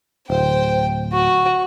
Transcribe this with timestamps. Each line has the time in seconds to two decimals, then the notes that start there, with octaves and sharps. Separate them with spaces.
0.30 D1 C5 G5
1.13 F#4 C#6